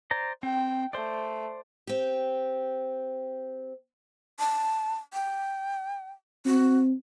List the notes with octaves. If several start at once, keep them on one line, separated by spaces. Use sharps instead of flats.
C5 D5 A#5
C4 G5
A3 C5 D5
C4 G4
A5
G5
C4 F#4